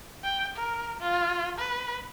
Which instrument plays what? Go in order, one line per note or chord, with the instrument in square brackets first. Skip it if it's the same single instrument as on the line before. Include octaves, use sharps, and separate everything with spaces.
[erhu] G5
A#4
F4
B4